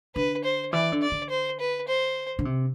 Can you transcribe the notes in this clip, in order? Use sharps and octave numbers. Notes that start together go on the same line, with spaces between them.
D3 B4
C5
E3 D5
D3
D5
D3
C5
B4
C5
D3
C3